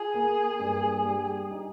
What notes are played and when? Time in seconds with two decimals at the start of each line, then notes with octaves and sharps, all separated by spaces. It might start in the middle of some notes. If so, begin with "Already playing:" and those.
Already playing: F4 G#4
0.14 A#3
0.60 G2
1.05 G3
1.51 D#4